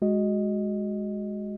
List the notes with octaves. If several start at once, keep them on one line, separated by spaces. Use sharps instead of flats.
G#3 F#4 D#5